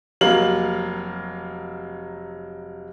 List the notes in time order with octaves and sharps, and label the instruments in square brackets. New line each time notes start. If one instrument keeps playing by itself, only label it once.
[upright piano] F1 F#3 A#3 F5 F#7